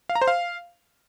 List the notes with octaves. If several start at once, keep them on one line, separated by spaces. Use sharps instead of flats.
F5
A#5
C5
F5